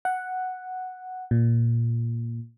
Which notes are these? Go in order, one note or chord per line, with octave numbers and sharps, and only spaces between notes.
F#5
A#2